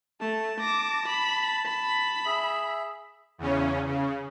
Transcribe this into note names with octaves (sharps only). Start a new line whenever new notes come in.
A3 A5
D6 A#6
B5
B5
G#4 E5
E2 C#3 C#4
C#3